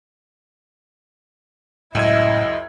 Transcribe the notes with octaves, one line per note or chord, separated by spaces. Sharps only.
C#2 F#2 A2 E4 D#5 G#6